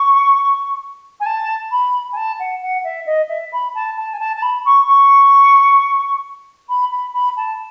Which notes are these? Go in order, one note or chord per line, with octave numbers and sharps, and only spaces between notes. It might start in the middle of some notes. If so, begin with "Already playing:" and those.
Already playing: C#6
G#5
A5
B5
G#5
A5
F#5
F#5
E5
D#5
E5
B5
A5
A5
G#5
A5
A5
B5
C#6
C#6
B5
B5
B5
A5